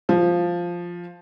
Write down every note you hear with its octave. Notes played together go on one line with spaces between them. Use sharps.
F3